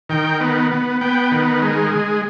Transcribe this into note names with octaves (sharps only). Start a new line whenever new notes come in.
D#3 G5
B3
B3
B3 G5
D#3
G#3